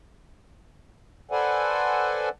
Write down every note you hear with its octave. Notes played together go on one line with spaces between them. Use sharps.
A4 B4 C5 D5 F#5 G#5